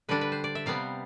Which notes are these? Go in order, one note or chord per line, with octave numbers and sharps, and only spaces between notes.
D3 G3 D4 B4
B4
C5
D5
E5
C3 G3 B3 F5